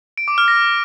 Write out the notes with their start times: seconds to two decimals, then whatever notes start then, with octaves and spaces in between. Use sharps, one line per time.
0.18 D7
0.28 D6
0.38 F6
0.48 A#6